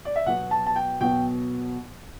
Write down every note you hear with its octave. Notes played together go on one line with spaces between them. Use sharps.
D5
E5
B2 F#3 B3 F#5
A5
A5
G5
B2 F#3 B3 G5